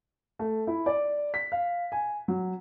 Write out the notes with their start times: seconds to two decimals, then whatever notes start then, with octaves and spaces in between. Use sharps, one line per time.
0.39 A3
0.67 E4
0.86 D5
1.34 B6
1.52 F5
1.92 G#5
2.28 F#3